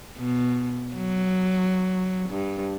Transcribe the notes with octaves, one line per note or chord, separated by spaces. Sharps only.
B2
F#3
G2